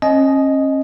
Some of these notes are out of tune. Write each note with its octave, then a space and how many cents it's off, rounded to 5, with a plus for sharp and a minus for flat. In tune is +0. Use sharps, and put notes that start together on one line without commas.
C#4 -40 D#5 +0 G#5 +40